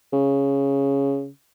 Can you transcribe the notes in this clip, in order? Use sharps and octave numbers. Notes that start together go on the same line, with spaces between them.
C#3